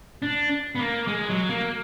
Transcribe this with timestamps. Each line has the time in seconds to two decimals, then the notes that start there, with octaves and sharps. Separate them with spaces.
0.22 D4
0.75 B3
0.79 A#3
1.07 G#3
1.29 F#3
1.49 A#3